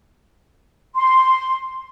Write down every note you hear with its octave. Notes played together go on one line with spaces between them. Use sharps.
C6